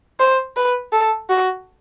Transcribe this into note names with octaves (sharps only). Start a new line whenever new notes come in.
C5
B4
A4
F#4